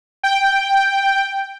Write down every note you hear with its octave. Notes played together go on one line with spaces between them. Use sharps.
G5